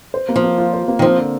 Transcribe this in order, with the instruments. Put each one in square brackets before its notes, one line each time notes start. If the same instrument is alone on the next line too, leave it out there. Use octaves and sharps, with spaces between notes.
[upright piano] C5
A#3
[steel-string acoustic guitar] F3
[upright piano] A#3
F4
C5
A#3
[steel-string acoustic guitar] D#3
[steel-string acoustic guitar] F3 [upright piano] C4
[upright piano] D3